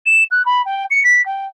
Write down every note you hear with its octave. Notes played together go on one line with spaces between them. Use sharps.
E7
F#6
B5
G5
C#7
B6
G5